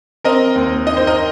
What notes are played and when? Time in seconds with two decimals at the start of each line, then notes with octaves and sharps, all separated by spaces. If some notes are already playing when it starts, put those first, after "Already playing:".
0.24 C4 A#4 D#5
0.55 D#2
0.86 D#3 D#5
0.97 C5
1.07 A#4 D#5